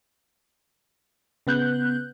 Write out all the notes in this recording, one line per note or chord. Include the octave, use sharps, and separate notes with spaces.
C#3 B3 F#6 G6